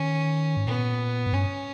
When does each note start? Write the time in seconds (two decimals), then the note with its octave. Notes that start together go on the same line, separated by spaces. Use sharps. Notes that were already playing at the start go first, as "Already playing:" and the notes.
Already playing: D#3 C#4
0.57 G#2
0.67 A#2 B3
1.27 G#2
1.33 G2 C#4